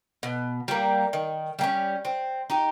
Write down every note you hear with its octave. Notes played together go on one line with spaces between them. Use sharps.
B2
G3 A#3
D#3
G3 A#3 C#4
C4
D#4 G4